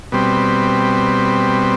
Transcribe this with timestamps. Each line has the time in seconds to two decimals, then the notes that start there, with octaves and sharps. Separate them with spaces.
0.12 B2 G3 C4